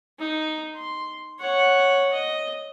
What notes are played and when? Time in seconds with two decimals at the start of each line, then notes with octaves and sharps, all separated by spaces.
0.19 D#4
0.76 C6
1.39 C#5 F#5
2.13 D#5